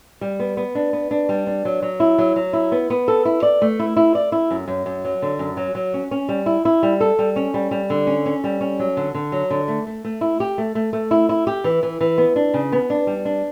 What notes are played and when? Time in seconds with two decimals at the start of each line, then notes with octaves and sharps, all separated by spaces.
0.21 G3
0.40 B3
0.57 B3
0.75 D4
0.93 B3
1.11 D4
1.29 G3
1.47 D4
1.65 F#3
1.82 F#3
2.00 E4
2.18 F#3
2.36 F#3
2.53 E4
2.72 B3
2.90 B3
3.08 A4
3.25 E4
3.43 D5
3.62 A3
3.79 E4
3.97 E4
4.15 D5
4.32 E4
4.51 F#2
4.68 F#2
4.86 F#2
5.04 F#3
5.22 D3
5.39 F#2
5.57 F#3
5.75 F#3
5.94 C#4
6.11 C#4
6.29 G3
6.46 E4
6.65 E4
6.83 G3
7.00 A4
7.19 G3
7.36 C#4
7.54 G3
7.71 G3
7.90 D3
8.07 C#4
8.26 C#4
8.44 G3
8.61 C#4
8.79 F#3
8.97 D3
9.15 D3
9.32 F#3
9.50 D3
9.68 A3
9.87 A3
10.05 A3
10.21 E4
10.40 G4
10.58 A3
10.75 A3
10.93 A3
11.11 E4
11.29 E4
11.47 G4
11.64 E3
11.83 E3
12.01 E3
12.18 B3
12.36 D4
12.54 C#3
12.72 B3
12.90 D4
13.07 G3
13.25 D4